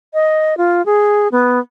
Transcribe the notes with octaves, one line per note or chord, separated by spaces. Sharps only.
D#5
F4
G#4
B3